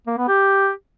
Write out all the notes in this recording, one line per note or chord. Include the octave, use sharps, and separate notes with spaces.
A#3
B3
G4